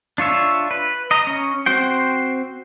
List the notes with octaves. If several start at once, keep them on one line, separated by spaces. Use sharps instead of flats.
D4 F4 C#5 E5
B4
D#5 A#5
C#4
C4 F#4 C5 G5